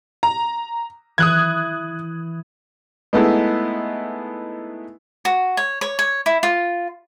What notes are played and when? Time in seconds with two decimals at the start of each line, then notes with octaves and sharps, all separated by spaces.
0.23 A#5
1.18 E3 D#6 F#6 G#6
3.13 G#3 A3 B3 D#4 E4
5.25 F#4
5.57 C#5
5.81 C#5
5.99 C#5
6.26 E4
6.43 F4